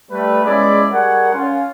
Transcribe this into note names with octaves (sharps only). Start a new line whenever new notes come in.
G3 A3 B4
G#3 B3 C#4 E4 G#4 D5
G3 G#4 A#4 C#5 F#5
C#4 F4